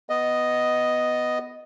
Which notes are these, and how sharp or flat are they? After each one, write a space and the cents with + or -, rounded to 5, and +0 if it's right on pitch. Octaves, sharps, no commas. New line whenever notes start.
B3 +5 D#5 +0